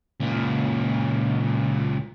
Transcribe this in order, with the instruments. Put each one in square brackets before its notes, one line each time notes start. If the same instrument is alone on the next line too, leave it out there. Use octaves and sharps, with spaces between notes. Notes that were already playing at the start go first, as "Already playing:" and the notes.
[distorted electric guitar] C#2 A#2